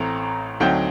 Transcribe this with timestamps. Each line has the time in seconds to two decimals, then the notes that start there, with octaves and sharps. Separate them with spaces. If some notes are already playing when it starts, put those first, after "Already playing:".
Already playing: A1 A2 A3 C4 A#5
0.60 D2 D3 F#3 C4 D#4 G5